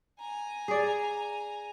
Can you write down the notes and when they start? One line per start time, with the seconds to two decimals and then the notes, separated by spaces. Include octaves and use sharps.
0.20 G#5 A#5
0.68 G#4 D5